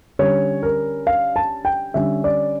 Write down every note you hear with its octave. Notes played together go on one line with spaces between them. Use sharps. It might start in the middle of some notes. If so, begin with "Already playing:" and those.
D3 G3 C#4 C#5
A#4
F5
A5
G5
D3 G3 C#4 E5
D5